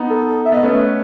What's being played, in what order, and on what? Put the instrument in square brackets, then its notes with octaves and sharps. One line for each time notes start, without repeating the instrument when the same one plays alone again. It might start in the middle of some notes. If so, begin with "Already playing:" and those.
Already playing: [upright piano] B3 D#4
[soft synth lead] A4
A4
E5
[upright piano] B3 [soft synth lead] D#5
[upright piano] A3 C#4 [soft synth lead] B4